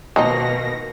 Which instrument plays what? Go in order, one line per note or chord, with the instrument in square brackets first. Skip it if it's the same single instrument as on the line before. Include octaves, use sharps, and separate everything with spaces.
[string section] B2 A#3 A#6 [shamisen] D#3 F3 D#4